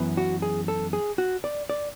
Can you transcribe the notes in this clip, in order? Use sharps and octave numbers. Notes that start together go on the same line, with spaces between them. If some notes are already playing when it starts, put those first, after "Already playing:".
Already playing: F#2 E3 B3
F#4
G#4
A4
G#4
F#4
D5
D5